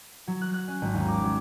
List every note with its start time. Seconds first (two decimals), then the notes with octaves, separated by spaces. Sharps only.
0.28 F#3
0.42 F#6
0.54 F#6
0.68 C#4
0.82 G#1
0.94 D#2
1.08 D6
1.24 F#3